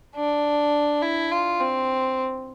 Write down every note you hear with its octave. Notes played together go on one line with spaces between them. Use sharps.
D4
E4
F4
C4